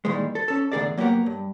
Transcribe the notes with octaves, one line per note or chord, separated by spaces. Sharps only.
A#2 D#3 E3 G3 G#3
A4
C#4 A4
E2 A2 D3 G#4 A#4 D5
F#3 A#3 B3 G4 A#4 F#5
G2